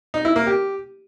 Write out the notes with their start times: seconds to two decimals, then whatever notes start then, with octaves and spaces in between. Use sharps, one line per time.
0.14 D#4
0.25 E4
0.36 A#3
0.47 G4